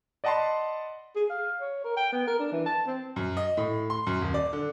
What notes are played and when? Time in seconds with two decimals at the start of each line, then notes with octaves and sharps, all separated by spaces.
0.24 D5 D#5 F#5 A5 B5 C6
1.16 G#4
1.30 F5
1.61 C#5
1.84 A#4
1.97 G5
2.13 B3
2.28 A#4
2.39 D4
2.52 E3
2.66 A5
2.87 C4
3.16 F#2
3.37 D#5
3.57 A2
3.90 C6
4.07 F#2
4.21 D#1
4.34 D5
4.53 D3